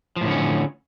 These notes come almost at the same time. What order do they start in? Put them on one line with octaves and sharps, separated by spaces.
F3 A2 D3 C#4